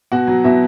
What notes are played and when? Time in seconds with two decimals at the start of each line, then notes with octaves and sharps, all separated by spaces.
0.12 B2 F#4 F#5
0.27 F#3
0.44 B2 E4 E5